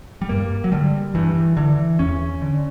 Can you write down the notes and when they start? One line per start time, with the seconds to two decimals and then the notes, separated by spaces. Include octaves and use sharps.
0.22 G3
0.29 G2 A#3
0.64 F#3
0.72 D3 G3
1.15 G2 E3
1.57 D3 E3
1.99 E2 C#4
2.42 D3